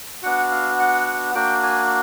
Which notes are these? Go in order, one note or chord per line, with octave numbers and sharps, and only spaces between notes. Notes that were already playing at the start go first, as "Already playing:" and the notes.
B3 D4 F#4 F#5
F5
F#5
A#3 D4 F#4 G5
G#5